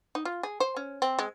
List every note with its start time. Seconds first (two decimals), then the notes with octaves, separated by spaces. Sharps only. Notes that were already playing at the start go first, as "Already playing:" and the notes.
0.15 D#4
0.25 F4
0.43 G#4
0.60 C5
0.76 C#4
1.02 C4
1.19 G#3